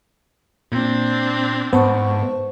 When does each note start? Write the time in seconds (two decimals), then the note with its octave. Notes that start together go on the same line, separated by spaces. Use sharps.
0.72 A#2 C4 D4
1.73 G#2 B3 C5 A5 C#6